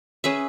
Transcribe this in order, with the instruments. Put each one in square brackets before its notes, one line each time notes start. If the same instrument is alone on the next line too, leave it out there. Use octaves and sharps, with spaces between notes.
[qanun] C#4 G#4 B4 E5